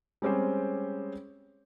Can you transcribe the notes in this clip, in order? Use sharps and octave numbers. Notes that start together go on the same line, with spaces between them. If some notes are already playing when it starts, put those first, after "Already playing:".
G3 G#3 C4 C#4 G4 C5